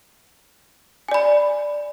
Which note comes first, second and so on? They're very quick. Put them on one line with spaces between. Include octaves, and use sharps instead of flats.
G#5 D5 B5